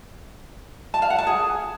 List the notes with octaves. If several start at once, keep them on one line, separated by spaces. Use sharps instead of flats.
A5
F5
F#5
A5
G#4